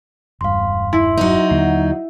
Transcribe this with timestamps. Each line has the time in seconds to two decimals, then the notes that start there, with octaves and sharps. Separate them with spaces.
0.41 E1 G2 F5 C6
0.93 E4 C6
1.18 F#3 D#4
1.51 D#2 D3 A#3 F#5